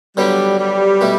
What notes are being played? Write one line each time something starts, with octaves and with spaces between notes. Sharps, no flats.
D3 F#3 G3 B3 D4
G3
B2 A3 E4